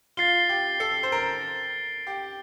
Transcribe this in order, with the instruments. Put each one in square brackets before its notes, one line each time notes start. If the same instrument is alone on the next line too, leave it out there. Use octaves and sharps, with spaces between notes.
[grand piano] F4 [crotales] A6 C7 G7
[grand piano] G4
A4
C5
A#4
G4